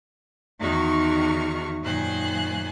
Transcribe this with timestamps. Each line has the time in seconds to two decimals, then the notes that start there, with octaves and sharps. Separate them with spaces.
0.60 E2 D#3 D#4 F#4 C#6 F6
1.83 F#2 A#2 D#3 C5 G#5 F#6